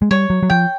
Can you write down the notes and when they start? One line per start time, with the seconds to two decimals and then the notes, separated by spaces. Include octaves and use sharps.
0.02 G#3
0.11 G3 C#5
0.30 F#3
0.43 F#3
0.50 F3 G5